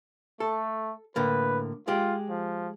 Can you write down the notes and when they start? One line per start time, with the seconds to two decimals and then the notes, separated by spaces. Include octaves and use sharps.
0.40 A3 A4
1.16 A2 D3 A#3 B4
1.88 G#3 F4 G4
2.29 F3